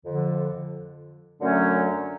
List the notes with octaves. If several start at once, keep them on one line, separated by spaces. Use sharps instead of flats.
F2 D3 F3
F#2 D3 F#3 A3 C#4